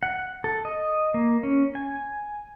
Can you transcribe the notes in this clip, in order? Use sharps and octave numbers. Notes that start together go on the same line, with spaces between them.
F#5
A4
D#5
A#3
C#4
G#5